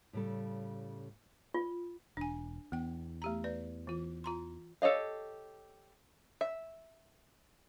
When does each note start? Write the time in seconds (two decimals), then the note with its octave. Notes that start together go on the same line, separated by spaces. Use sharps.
0.13 A2 C#3 G3 A4
1.54 F4
2.17 E1 D4 G#5
2.72 E2 B3 G5
3.22 A3 G4 A#5
3.44 B4 D5
3.87 E3 F4
4.24 F4 A#5 C6
4.82 G4 A4 C#5 D#5 F5
6.41 E5